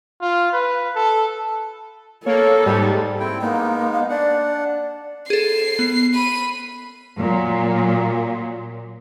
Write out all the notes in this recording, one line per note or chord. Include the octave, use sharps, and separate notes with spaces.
F4
B4
A4
A#3 A4 C#5
G#2 G3
C4 E4 G5
G#3 A#3 B3 D#4
F5
D4 D5 F#5
G#4 A4 C7
B3
B5 D#7
A#2 F#3